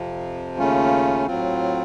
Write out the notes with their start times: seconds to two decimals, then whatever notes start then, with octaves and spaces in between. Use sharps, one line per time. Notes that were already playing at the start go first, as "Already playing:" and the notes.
Already playing: F2 C3 F3
0.58 D#2 C#3 A3 C#4 F4
1.27 A2 F#3 C4 F4